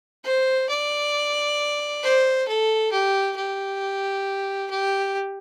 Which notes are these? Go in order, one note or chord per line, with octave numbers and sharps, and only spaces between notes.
C5
D5
C5
A4
G4
G4
G4